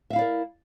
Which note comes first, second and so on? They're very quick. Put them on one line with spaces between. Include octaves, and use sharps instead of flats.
E5 F5 E4 D5 A#4